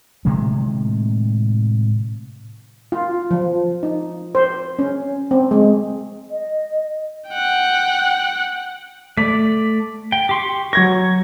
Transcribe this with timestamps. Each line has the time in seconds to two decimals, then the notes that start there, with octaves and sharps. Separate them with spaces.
0.25 A2 C3 D#3 G#3
2.92 F4
3.31 F3
3.83 D#4
4.35 C5
4.79 C#4
5.31 C4
5.51 G#3
6.30 D#5
7.29 F#5 G5
9.17 A3 D5 B6
10.12 G5
10.29 G4 C6 C#6
10.73 F#3 C#6 G#6 A#6